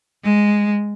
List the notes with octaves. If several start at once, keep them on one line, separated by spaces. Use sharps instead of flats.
G#3